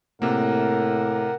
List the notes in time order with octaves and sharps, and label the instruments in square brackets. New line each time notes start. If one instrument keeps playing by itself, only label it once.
[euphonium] A2 [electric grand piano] C3 A#3 [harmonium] A#4 F#5